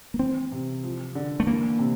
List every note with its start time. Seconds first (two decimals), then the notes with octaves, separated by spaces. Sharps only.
0.14 A#3
0.19 E3 C4
0.52 C3
0.83 F3
1.15 D3
1.40 A3
1.47 E3 A#3
1.79 C3